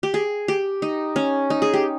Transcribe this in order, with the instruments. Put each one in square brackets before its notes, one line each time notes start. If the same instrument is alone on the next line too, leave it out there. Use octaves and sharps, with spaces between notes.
[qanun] G4
G#4
G4
D#4
C#4
D#4
G#4
G4